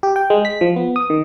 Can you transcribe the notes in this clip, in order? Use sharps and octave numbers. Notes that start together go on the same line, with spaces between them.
G4
G5
G#3
B6
F3
B3
D#6
D#3